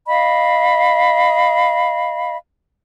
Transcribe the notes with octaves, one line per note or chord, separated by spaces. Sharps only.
D#5 F5 B5